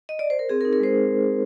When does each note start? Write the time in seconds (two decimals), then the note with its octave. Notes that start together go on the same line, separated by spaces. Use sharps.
0.09 D#5
0.19 D5
0.30 C5
0.39 A#4
0.49 C4 G#4
0.61 A#4
0.65 D#4
0.73 A#4
0.80 G#3 C5